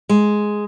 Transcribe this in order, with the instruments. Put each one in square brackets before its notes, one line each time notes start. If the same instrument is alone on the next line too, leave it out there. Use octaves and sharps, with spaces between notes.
[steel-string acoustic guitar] G#3